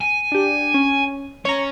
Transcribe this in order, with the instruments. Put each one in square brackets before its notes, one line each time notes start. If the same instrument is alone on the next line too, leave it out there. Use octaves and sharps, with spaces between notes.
[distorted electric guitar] G#5
[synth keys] D4 G4
C#4
[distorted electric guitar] C#4 [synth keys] C#5 A#5